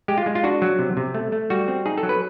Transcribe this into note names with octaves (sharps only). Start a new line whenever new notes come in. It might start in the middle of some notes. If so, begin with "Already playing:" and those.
G#3 G4
F4
G#3
F4
D4 F#4
F#3
C3
C3
A3
A3
G3 F#4
C4
D#4 G#4
A4
F#3
B4